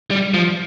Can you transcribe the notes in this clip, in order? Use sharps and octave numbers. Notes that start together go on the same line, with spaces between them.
G3
F3